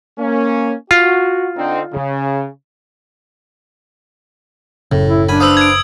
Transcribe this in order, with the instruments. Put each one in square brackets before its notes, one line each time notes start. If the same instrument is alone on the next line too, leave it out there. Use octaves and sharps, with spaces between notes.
[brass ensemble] A#3 C#4
[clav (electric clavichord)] F4 [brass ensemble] F#4
[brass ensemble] D3 C4 D#4
C#3
[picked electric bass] F#1 C#3 [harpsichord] A2
[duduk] E4
[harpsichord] F#2 G#5 B5 [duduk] D4
[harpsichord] B4 C5 F5 [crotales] D#6 E6
[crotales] G#6 D7